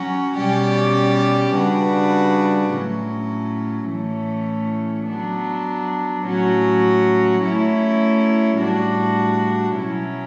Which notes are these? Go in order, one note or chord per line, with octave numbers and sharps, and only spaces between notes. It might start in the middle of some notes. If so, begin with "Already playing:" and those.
Already playing: F#3 C#4 F#4
B2 G3 C#4 G4 D5
C#3 G3 D4 F#4 B4
A2 F#3 C#4
A2 E3 A3 C#4
F#3 B3 D4
A2 F#3 C#4 F#4
F#3 A3 C#4 E4
A2 G3 D4 F#4
B2 F#3 C#4 E4